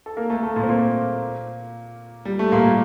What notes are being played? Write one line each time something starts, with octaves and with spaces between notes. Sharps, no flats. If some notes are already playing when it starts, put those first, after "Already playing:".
A4
A#3 A#4
A3 A4
A3 A4
A#2 A#3
C4
A#2 A#3
G3
A3
A#2 A#3
G3